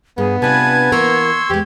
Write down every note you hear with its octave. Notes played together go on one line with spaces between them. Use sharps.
G2 B3 G#4
C3 D4 F4 B4 G#5 A5 G#6
E3 A#3 A#4 C6 C#6 E6
E2 G#3 G4